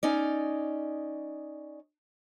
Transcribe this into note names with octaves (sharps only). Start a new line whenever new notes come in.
C#4 D#4 D5